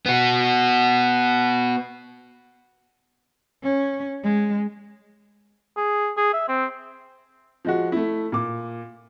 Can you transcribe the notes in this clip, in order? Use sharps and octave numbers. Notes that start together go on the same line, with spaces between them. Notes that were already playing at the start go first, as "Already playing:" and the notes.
B3 F#4
C#4
G#3
G#4
G#4
E5
C4
F3 G#3 F#4
A3 E4
A#2 D6